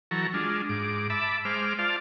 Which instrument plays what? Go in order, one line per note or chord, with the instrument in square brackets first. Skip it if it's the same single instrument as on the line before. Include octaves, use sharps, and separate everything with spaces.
[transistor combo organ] E3 F#3 A4 A#5 C#6
G#3 D4 F4
G#2 D6
E5 A5 B5 D6
G#3 C5 D6 F6
F4 C5 D5 F5 A5